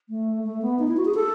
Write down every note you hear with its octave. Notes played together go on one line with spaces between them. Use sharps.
A3
A3
B3
D#4
E4
F#4
G#4
A4